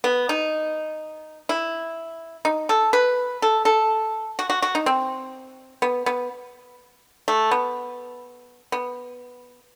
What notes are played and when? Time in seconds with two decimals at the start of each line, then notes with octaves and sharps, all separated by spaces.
0.04 B3
0.29 D#4
1.49 E4
2.45 D#4
2.69 A4
2.93 B4
3.42 A4
3.65 A4
4.39 F#4
4.50 F#4
4.62 F#4
4.75 D#4
4.86 C4
5.82 B3
6.06 B3
7.28 A3
7.51 B3
8.72 B3